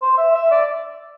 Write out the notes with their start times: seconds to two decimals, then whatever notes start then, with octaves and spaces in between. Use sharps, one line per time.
0.02 C5
0.18 E5
0.35 E5
0.51 D5